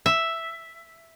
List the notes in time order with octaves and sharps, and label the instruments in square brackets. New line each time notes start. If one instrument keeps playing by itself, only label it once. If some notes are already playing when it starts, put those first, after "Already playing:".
[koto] E5